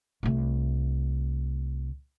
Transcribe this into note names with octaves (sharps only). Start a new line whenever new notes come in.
C2 A3